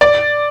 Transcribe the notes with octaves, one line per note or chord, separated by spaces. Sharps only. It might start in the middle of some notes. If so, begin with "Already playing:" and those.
D5